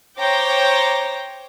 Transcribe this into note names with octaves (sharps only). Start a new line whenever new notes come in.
C5 C#5 G5 A#5 D6